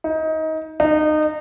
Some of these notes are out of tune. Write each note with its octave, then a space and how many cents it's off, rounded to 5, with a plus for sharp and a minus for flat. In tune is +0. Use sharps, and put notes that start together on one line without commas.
D#4 +25
D#4 -25